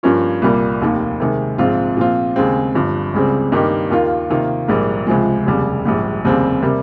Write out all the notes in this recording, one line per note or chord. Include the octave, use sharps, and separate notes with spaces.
G2 F3 A#3 C#4 F4
C2 A#2 G3 A#3
F1 D#2 D#3 A#3
C3 D#3 G#3
A#1 G#2 F3 C4 F4
A#2 F3 C4 F4
D#2 C#3 G#3 C4
G1 G2 F3
C#2 C#3 G3 C4
G2 D#3 A#3 D#4 G4
D#2 D#3 A#3 F4
C3 D#3 A#3 F4
A#1 G#2 G3 A#3
C#2 C3 F3 G#3
F1 D#2 C#3 G3
A#1 G#2 G3
F1 D#2 C#3 G3 C4
C3 G3 A#3